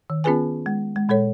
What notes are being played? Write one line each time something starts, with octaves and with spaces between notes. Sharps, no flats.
D#3
B3 C#4 F4 G#4 B4 G#5
G#3
G#3
A#2 G#3 A4 C#5